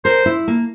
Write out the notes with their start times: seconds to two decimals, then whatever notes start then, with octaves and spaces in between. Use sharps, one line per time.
0.05 A#4 C5
0.26 E4
0.48 A#3